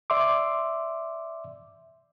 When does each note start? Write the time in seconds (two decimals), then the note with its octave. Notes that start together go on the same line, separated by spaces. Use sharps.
0.10 D5 E5 C6 D6